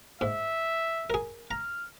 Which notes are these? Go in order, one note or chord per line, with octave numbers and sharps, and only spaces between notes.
G#2 E5
G#4 A#4
A#5 F6